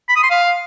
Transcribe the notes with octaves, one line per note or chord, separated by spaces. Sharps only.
B5
D#6
C6
F5